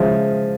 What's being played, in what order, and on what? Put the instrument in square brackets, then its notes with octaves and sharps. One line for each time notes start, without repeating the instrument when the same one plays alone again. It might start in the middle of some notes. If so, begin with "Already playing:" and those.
Already playing: [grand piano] C#3 F3 G#3 E5